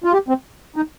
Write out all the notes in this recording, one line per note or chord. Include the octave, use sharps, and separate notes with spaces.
F4
G4
C4
D#4